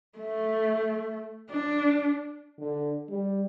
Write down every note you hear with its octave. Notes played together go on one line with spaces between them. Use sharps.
A3
D4
D3
G3